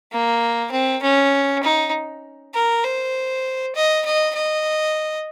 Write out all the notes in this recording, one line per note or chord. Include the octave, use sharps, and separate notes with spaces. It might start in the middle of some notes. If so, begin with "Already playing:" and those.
A#3
C4
C#4
D#4
A#4
C5
D#5
D#5
D#5